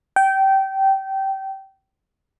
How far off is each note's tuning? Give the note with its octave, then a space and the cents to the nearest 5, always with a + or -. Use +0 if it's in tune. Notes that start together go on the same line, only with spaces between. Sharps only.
G5 -20